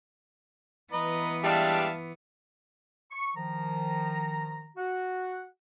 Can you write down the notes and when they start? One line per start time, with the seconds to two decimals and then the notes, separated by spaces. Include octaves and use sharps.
0.93 E3 B3 B4 D#5 A#5
1.44 G3 G#3 D4 E5 F5 A5
3.11 C#6
3.35 D#3 F3 A#5
4.77 F#4 F#5